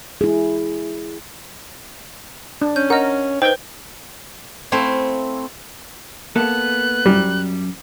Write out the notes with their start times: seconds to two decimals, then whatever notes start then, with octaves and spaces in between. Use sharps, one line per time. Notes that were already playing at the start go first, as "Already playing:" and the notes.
0.21 E4 G#4
2.62 D4
2.76 C#4 G6
2.90 A#4 D#5 F#5
3.42 D#4 B4 C5 G5
4.72 A3 C4 E4 F5
6.36 A#3 B3 A4 F#6
7.06 F#2 G3